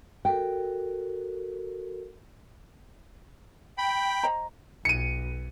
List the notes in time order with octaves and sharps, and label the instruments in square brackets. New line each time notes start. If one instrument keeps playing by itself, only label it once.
[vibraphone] F#4 A4 A#4 [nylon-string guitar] G5
[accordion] G5 [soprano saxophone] B5
[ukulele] C5 D#5 A#5
[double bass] B1 [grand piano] C#7 D#7